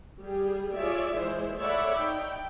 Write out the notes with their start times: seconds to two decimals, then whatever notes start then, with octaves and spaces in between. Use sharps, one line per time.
0.21 G3 G4 G#4
0.74 F4 G#4 C#5 D5 E5
1.16 E3 G#3 E4 C5
1.58 A4 C#5 D5 E5 F#5 B5
1.96 D#4 G5